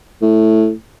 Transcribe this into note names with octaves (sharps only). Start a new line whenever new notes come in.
A2